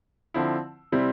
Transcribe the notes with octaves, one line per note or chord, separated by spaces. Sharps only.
D3 F3 C4 E4
C3 G3 C4 E4